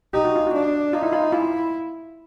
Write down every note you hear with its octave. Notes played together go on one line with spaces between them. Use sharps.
D#4 G4
F#4
F4
F#4
D4
D#4 F4
E4
F4
E4 F4